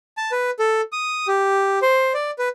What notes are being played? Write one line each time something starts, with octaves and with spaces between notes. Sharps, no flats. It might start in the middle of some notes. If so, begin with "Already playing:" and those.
A5
B4
A4
D#6
G4
C5
D5
B4